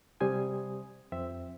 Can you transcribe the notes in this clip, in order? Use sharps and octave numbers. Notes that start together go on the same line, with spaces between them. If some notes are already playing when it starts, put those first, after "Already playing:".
C3 G3 C5 G#5 D#6
F2 C4 E5